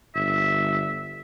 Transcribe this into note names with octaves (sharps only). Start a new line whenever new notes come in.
G1 E5